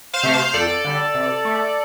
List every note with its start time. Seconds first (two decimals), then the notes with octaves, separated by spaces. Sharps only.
0.14 C5 F5
0.23 C3 A3
0.33 C5 F5
0.54 F2 A4 D5
0.84 D3 G3
1.15 C3
1.45 A3